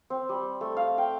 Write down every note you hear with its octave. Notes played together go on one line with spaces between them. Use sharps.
C4
G3
A3
F5
G5